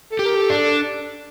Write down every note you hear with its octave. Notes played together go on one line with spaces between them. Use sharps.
A4
G4
A#4
A4
D4
A4